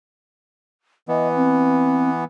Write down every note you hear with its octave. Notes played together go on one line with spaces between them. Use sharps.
E3 B3 D#5
C4